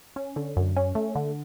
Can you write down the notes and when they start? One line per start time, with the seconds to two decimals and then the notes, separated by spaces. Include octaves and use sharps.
0.16 C#4
0.36 D3
0.57 F#2
0.76 C#4
0.95 A3
1.15 D3